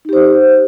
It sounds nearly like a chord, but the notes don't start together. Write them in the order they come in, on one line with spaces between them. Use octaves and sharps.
D#4 G4 C5